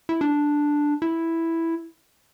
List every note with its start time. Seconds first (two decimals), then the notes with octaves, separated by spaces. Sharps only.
0.09 E4
0.21 D4
1.02 E4